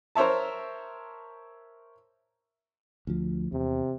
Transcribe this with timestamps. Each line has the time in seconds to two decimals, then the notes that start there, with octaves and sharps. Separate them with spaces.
0.15 A#4 C5 C#5 E5 A5
3.07 D2 F3
3.52 E2 C3